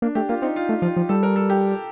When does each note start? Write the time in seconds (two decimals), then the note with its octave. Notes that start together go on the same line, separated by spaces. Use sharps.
0.02 A#3 D4
0.15 A3 G4
0.29 A#3 F4
0.42 C4 D#4
0.56 F4
0.69 A3
0.82 F3 F4
0.97 F3
1.09 G3 A4
1.23 A#4
1.36 A4
1.50 G4